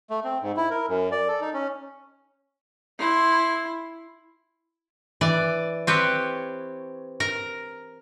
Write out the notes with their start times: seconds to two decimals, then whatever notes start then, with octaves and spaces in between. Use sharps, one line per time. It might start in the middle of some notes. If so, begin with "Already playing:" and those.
0.10 A3
0.24 C4
0.42 G#2
0.57 E4
0.70 A#4
0.88 F#2
1.12 D5
1.28 A4
1.41 D#4
1.54 C#4
2.98 E4 C6
5.21 E3 D5
5.87 C4 G4 B4 C#5
7.20 A#4 A#5